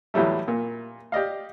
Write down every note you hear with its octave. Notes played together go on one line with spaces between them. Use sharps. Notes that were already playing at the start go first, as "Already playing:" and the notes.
E2 A2 F#3 G3 A3
A#2
G4 D5 D#5 F5